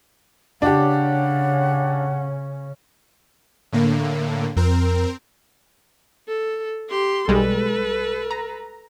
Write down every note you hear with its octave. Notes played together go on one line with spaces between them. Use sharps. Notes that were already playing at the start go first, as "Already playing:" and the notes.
C#3 C#4 D4 G4 F#5
A2 D3 A#3
F2 C4 A#4
A4
G4 C6
B1 G3 G#3 A4 B4
A#5